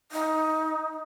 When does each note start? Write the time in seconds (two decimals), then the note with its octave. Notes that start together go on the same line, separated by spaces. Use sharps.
0.12 D#4